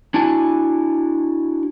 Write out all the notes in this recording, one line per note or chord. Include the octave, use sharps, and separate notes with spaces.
D4 E4 F#4 G#5 A5